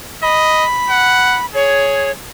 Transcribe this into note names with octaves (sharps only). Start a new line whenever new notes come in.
D#5 B5
F#5
G#4 C#5